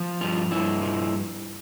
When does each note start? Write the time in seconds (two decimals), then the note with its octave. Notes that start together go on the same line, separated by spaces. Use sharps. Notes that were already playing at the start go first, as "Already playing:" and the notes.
Already playing: F3
0.21 G2 F4
0.51 G2 E4
0.81 F3